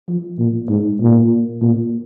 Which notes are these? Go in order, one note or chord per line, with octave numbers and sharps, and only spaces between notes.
F3
A#2
G#2
A#2
A#2